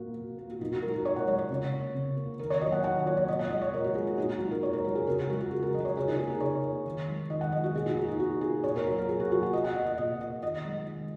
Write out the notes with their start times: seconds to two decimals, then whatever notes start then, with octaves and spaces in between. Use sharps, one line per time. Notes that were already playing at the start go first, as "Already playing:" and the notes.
Already playing: A#2 A#3 F#4
0.17 A#2
0.38 A#3
0.51 F#4
0.60 A#2 D#4
0.72 F#4
0.82 G#3 A#4
0.94 A#4
1.05 A#2 C#5
1.16 F#5
1.28 G#3 C#5
1.39 C#5
1.51 C#3
1.73 A#3
1.95 C#3
2.17 A#3
2.39 D#3 A#4
2.50 C#5
2.61 F#3 A#3 D#5
2.72 F#5
2.84 D#3 F#5
3.06 F#3 A#3 C#5
3.17 C#5
3.28 A#2 D#5
3.39 F#5
3.50 G#3 D#5
3.62 C#5
3.73 A#2 A#4
3.84 F#4
3.95 G#3 G#4
4.07 F#4
4.18 A#2 D#4
4.29 F#4
4.40 G#3 F#4
4.51 A#4
4.62 A#2 C#5
4.73 A#4
4.84 G#3 F#4
4.95 G#4
5.07 C#3 A#4
5.18 A#4
5.29 G#3 F#4
5.41 F#4
5.51 C#3 G#4
5.63 A#4
5.74 G#3 D#5
5.80 A#4
5.85 C#5
5.97 C#3 G#4
6.08 D#4
6.18 A#3 G#4
6.30 A#4
6.41 C#3 C#5
6.63 A#3
6.85 D#3
7.08 G#3
7.30 D#3 D#5
7.41 F#5
7.52 G#3 D#5
7.64 F#4
7.75 A#2 G#4
7.86 D#4
7.97 A#3 F#4
8.08 D#4
8.19 A#2 F#4
8.41 A#3 G#4
8.64 A#2 C#5
8.76 A#4
8.87 F#3 A#3 F#4
8.98 A#4
9.09 A#2 G#4
9.20 F#4
9.31 F#3 A#3 F#4
9.43 F#5
9.53 A#2 D#5
9.64 F#5
9.75 A#3 D#5
9.86 D#5
9.98 A#2 D#5
10.20 A#3 D#5
10.43 D#3 D#5
10.65 G#3
10.87 D#3